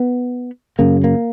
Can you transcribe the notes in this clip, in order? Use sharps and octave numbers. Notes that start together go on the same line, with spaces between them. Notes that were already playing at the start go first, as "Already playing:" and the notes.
Already playing: B3
F#2 C#3 A#3
A#3